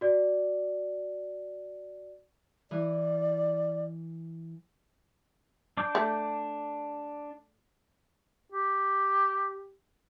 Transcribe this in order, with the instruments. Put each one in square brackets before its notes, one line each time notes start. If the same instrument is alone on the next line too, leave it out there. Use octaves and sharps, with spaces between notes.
[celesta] F#4 D5
[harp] E3 [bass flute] D5
[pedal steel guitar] D4 D6 G6
[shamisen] A3
[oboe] G4